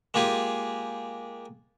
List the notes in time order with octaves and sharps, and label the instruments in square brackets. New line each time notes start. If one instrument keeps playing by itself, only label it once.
[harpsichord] G#3 A#3 F4 G4 G#5